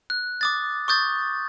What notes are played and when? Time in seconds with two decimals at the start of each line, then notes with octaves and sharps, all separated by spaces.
0.10 F#6
0.41 D6 D#6 A6
0.88 C#6 D#6 G6 A6